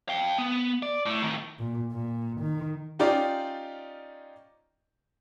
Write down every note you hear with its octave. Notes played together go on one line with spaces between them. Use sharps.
F5 G5
B3
D5
A2
A2 D#3
A#2
A#2
D#3
C#4 D#4 F4 G4 D5